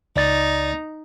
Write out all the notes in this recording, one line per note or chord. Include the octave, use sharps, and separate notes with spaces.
C#2 D#4 D5 A6